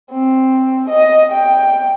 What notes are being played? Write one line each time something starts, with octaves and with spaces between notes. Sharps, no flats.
C4
D#5
G5